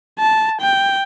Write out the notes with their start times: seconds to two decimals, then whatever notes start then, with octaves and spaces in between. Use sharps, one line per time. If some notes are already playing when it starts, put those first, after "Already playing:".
0.19 A5
0.61 G5